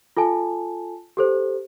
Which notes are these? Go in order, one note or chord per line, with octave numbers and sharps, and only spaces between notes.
F4 A4 G#5 A5
G4 A4 C5